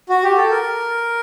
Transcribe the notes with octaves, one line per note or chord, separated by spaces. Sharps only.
F#4
G4
A4
A#4